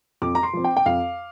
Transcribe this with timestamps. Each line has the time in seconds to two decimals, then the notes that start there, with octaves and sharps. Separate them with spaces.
0.22 F2 D6
0.35 A#5
0.43 C6
0.53 F3 C4
0.64 G5
0.77 G5
0.86 F2 F5